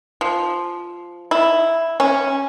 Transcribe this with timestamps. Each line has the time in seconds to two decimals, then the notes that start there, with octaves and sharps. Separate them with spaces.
0.21 F3
1.31 E4
2.00 C#4